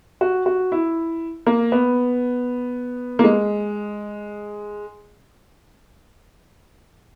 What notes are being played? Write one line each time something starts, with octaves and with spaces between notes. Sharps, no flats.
F#4
F#4
E4
A#3
B3
A#3
G#3